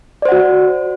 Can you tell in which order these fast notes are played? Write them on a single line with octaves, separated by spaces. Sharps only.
D5 C5 F#5 F#4